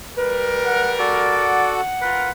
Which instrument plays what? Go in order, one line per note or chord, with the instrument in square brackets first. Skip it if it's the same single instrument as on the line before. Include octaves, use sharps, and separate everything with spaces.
[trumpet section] G3 A#4 [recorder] B4
[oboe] F#5
[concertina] F#4 A4 [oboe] D5
[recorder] F#5
[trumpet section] F4 A#4 [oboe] B4